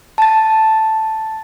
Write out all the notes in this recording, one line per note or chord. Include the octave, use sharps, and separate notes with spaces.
A5 A6